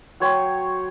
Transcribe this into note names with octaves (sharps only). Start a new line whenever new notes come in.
F#3 C#5 G5 C6